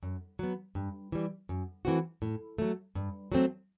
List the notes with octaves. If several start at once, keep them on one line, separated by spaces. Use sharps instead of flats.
F#2
F#3 B3
G2
E3 G3
F#2
E3 A3 C4 F#4
A2
F#3 A3
G2
F#3 A3 C4